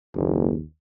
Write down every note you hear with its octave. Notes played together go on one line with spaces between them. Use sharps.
F#1 D#2